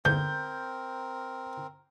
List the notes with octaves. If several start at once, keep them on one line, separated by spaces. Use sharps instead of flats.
E2 G#2 D3 C4 A#4 G6